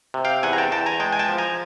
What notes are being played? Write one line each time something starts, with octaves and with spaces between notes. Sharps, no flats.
C3
F5 G5
E2 F#5 G#5
A#5
G5 A5
E2 G5 A5
G#5 A#5
G#3 G5 A5
G#5
G5 A5
F3
G#5 A#5